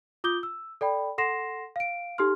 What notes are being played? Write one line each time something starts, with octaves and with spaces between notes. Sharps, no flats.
F4 D6 D#6 G6 G7
E6
A4 D5 G5 B5
A4 F#5 C6 A#6 C7 E7
F5 D7
D#4 G4 A4 C6 F6